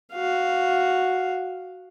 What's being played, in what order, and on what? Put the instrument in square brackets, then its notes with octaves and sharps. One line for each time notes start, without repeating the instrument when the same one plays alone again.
[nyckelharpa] F#4 F5